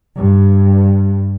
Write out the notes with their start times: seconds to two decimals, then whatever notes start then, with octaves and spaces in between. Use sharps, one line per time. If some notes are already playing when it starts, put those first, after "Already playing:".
0.16 G2